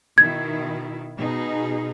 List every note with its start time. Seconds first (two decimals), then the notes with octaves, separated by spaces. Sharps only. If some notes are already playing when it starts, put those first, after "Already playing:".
0.18 B2 D#3 E4 G#6
1.18 B2 D#4 G#4